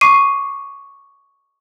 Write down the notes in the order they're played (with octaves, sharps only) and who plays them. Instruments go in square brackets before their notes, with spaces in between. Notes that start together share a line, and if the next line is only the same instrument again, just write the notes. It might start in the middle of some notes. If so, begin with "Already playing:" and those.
[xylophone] C#6 D6 C7 D#7